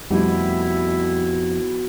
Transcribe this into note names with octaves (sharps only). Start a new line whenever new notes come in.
F2 B2 G3 A3 D#4 E4 D6